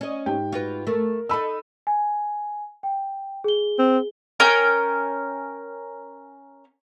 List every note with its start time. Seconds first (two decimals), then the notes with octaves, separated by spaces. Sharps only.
0.01 C#4 D#5
0.26 G#2 G4 G5
0.52 F4 F#4 B4
0.87 A3 A#4
1.29 D#4 A4 B5 E6
1.87 G#5
2.83 G5
3.44 G#4 G7
3.78 C4
4.40 C#4 A#4 G5 G#5